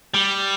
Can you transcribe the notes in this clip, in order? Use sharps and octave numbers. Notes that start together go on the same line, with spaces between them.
G3